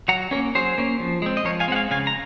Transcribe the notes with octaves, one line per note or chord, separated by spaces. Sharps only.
F#3 F#5 A#5
A#3 C#4 A#4 C#5
F#3 G#4 C5
A#3 C#4
F3
G#3 C4
D#5
F3 A#4 C#5
F5 G#5
G#3 C4 F#5
F5 G#5
C#3 F5 G#5
A#5